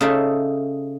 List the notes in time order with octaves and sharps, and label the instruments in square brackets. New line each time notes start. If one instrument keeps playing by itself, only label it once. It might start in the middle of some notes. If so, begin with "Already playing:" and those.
[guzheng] C#3 D#4 E4 A4 E5 C6